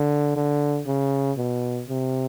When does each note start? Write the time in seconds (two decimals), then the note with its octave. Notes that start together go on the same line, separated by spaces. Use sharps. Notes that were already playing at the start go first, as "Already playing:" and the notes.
Already playing: D3
0.36 D3
0.87 C#3
1.37 B2
1.88 C3